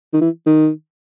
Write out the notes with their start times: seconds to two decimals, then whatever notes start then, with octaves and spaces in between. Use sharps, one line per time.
0.13 D#3
0.21 E3
0.47 D#3